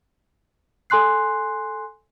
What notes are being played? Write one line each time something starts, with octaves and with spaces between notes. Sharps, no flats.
A4 G#5 C6 F#6 C7